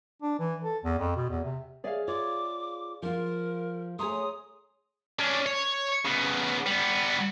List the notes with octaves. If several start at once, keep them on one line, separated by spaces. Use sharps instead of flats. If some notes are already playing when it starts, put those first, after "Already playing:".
D4
E3
A4
E2
F2
B2
E2
C3
G#4 C#5 D5 E5 F5
F4 C#5 D5 D6
F3 F4 A#4
A3 G#4 C#5 A#5 C6 D#6
C#4 D4
C#5
C#3 B3
G3 B3